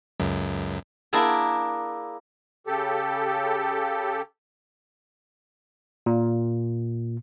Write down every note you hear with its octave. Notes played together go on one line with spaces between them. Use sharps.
C#2 F#2
A#3 D4 E4 G#4
C#3 G4 A4
A#2